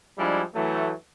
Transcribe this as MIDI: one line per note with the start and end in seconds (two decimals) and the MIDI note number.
0.18 0.41 53
0.18 0.41 55
0.18 0.41 56
0.18 0.41 62
0.18 0.41 64
0.54 0.91 52
0.54 0.91 54
0.54 0.91 57